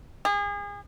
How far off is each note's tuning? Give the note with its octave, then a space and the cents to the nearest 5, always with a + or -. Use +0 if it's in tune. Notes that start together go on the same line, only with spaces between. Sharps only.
G#4 -35